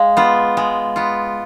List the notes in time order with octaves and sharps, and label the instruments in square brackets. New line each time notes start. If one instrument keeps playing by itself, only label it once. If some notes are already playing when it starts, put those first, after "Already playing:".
Already playing: [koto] G#3 [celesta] F5
[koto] B3 F4
G#3
B3 F4